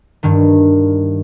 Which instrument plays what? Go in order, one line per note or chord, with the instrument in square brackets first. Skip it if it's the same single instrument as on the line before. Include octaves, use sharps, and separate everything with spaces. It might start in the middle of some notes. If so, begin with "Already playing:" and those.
[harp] G2 D#3